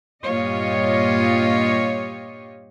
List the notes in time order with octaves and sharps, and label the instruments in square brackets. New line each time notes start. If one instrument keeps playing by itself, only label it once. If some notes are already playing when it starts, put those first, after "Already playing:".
[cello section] G2 A#2 F4 G4 C#5 D#5